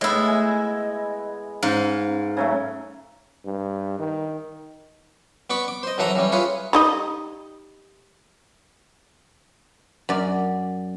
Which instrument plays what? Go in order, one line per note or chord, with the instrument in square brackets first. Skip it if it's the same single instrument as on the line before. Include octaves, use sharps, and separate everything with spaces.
[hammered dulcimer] A2 B3 [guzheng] G#3 E4 [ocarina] D#5
[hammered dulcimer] G#5
[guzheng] G#2 [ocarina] C#4 [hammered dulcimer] F5
[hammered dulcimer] C#3 F#3 A3
[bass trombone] G2
D#3
[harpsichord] B3 D5 B5 C#6 D6
D6
C5 D#5
F#2 E3 F#3 A4 E5 A#5
E3 G3 C#4
E4 F4 G#4 B4 C#5
[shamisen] G3 D#4 D#5
[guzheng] F#2 D5